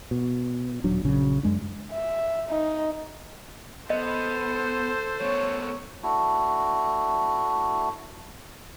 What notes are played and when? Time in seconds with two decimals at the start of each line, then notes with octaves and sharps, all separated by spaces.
0.11 B2
0.84 D#1 F#3 D4
1.03 A#1 C#3 F#3
1.43 F#2 G#3 D4
1.92 E5
2.48 D#4
3.90 B3 A4 C5 D#5
5.21 A3 B3 C#5
6.03 A3 D4 E4 F#4